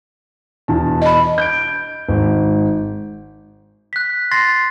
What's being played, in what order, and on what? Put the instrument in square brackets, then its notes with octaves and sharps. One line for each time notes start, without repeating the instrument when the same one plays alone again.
[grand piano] E2 B2 A5
[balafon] D#5 B5
[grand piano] G6 D7
G#1
[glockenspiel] F#6 B6
C6 A6 A#6 C7